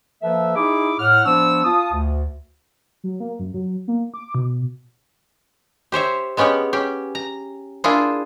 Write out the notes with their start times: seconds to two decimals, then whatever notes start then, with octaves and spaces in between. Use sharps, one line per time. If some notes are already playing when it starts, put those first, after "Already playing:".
0.22 F3 A#3 A4 B4 E5
0.56 D#4 E4 G#4 E5 B5 D6
0.99 A2 F#5 F6
1.25 F3 B3 D4 C5 C#6 E6
1.64 F4 A5 D#6
1.93 D2
3.04 F#3
3.20 A#3
3.39 F#2
3.54 F#3
3.88 A#3
4.14 D6
4.35 B2
5.92 G4 C5 C#5 E5
6.37 G#3 B3 C#4 G4 C#5
6.73 C#4 G4
7.15 A#5
7.84 A#3 D4 E4 F4 G#4